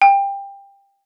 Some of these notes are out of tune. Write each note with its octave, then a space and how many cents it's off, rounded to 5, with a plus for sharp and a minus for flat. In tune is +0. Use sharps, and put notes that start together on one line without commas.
G5 +20